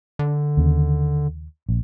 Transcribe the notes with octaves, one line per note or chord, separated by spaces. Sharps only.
D3
D#2 C#3
A#1